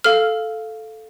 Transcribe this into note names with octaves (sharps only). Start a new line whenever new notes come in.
A4 F5 F6